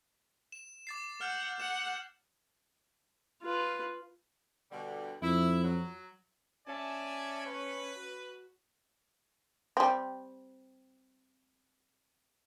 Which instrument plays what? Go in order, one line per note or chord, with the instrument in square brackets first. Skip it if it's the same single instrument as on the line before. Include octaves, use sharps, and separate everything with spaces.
[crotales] E7
D6 A6 C7
[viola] F#5 [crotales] F6 G6
[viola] F#5 [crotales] E7
[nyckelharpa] F4 B4
[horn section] B2 D3 G3
[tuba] F2 [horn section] E4
[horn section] F#3
[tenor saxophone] C#4 [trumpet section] D5 E5 G#5 [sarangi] A5
[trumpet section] B4 [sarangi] C#5
[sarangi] F#4
[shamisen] G3 C4